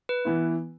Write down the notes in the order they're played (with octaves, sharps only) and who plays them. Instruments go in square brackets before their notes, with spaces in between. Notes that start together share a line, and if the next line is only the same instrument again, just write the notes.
[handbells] B4
[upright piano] E3 B3 E4